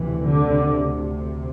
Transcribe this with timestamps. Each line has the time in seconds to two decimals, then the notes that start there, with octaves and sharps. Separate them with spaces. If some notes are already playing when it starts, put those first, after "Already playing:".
Already playing: D2 C3 E3
0.27 D3